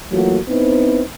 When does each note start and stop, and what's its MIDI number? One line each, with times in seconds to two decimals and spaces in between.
0.12 0.37 52
0.12 0.37 54
0.12 0.37 57
0.12 0.37 58
0.12 0.37 65
0.12 0.37 66
0.48 1.02 59
0.48 1.02 60
0.48 1.02 63
0.48 1.02 64
0.48 1.02 71
0.48 1.02 72